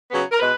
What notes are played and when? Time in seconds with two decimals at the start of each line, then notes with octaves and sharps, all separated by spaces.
0.11 C#3 F#3 B3
0.31 A#4
0.39 B2 G#3 B4